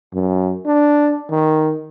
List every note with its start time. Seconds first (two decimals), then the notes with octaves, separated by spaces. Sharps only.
0.14 F#2
0.66 D4
1.30 D#3